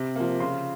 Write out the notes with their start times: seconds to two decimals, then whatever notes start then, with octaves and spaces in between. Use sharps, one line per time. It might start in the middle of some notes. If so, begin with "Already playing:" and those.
Already playing: C3
0.16 F3 A#3
0.40 C#3 C6